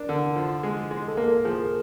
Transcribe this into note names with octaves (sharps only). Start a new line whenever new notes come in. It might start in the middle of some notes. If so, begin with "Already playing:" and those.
Already playing: D4 A#4
D3
F3
G#3
G#3
A4
A#3 A#4
F3 G#4